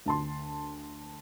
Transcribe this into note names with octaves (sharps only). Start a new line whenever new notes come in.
D2 A5 C6